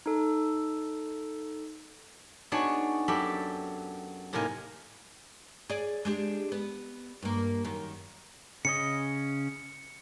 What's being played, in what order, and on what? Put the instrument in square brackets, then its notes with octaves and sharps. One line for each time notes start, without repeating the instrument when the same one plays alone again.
[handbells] D#4 A4
[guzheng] B3 D4 D#4 F#4 G#4 C#5
F#2 G4 A4 D5 E5 B5
A2 C3 A#3 D#4 A#4 G#5
[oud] G#4 D5
G#3 D4 G4
B3
G2 A#3
F#2 D#3
[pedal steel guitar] C#3 C#4 D#5 [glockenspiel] C#7